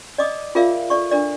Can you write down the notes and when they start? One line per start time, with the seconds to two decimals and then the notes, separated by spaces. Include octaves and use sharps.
0.18 D5 D#5 D6 D#6
0.55 F4 G#4 A#4 D5 E5 F5
0.90 A4 D5 C#6
1.11 D4 A#4 D5